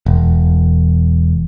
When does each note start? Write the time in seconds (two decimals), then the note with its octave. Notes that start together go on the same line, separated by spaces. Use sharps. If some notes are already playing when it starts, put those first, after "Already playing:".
0.06 E1